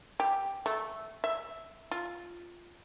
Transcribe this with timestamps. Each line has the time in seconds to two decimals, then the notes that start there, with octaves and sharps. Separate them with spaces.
0.20 G4
0.66 A3
1.24 E5
1.92 F4